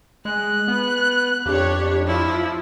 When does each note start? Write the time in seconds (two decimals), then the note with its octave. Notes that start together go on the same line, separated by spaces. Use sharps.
0.25 G#3 F#6
0.68 B3
1.46 F2 D4 G4 C#5
2.07 F3 E4